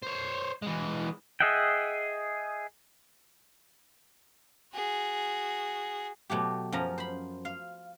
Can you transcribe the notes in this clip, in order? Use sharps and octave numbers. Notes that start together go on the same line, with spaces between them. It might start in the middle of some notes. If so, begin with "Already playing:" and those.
C5 C#5
E3 G#3
G#4 D#5 E5 F#5 G5
F#4 G#4
B2 F#3 A3 G4
F#2 F3 C#4 A#5
C5 B5
F5